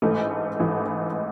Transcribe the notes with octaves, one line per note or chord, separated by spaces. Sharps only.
A1 G#2 E3 A3
A1 G#2 E3